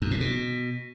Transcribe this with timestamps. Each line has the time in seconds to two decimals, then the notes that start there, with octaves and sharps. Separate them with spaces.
0.02 F#2
0.11 A2
0.21 B2